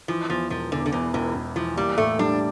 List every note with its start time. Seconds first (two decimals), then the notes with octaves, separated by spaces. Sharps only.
0.08 E3 F3
0.30 E2 F3
0.50 E1 F3
0.72 E2 D3
0.86 D3
0.92 E2 E3
1.14 E1 E3
1.35 E1
1.56 E3 F3
1.76 G3 A#3
1.98 A2 A3
2.19 G3 D4